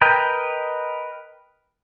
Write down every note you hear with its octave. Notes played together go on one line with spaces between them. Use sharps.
A#4 B4 D#5 G5